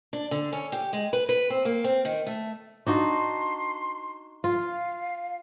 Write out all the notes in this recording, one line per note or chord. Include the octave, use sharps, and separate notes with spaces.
D4
D3
C#4
G4
G#3
B4
B4
C4
A#3
C4
D#3
A3
D4 D#4 F#4 C6
F4 F5